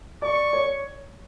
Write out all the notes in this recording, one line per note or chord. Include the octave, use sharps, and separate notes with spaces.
D5 C#6
C#5